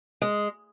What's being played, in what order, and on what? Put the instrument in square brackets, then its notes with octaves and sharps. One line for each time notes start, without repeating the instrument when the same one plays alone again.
[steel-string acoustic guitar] G#3